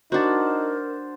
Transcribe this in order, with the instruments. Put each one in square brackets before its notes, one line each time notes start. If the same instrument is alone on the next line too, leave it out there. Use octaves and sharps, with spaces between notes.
[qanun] D4 F#4 [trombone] D#4 [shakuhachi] A#4 [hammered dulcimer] C5 F#5 A5